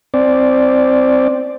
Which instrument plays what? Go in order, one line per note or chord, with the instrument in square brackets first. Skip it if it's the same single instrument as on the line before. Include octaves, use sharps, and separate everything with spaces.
[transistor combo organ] C4 D5